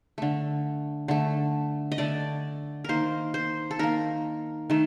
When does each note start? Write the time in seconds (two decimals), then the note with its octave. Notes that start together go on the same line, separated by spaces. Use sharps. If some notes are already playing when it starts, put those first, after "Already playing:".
0.18 D3 A3
1.08 D3 A3
1.92 D#5
1.98 D3 A3 D5
2.84 D#3 A#3 A#4 C5
3.34 C5
3.71 A4
3.79 D#3 A#3 A#4
4.70 D#3 A3